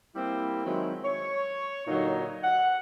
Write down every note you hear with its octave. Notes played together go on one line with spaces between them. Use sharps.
G3 A#3 C4 E4
D#3 F#3 G#3 C4 E4
C#5
A#2 D3 F#3 D#4
F#5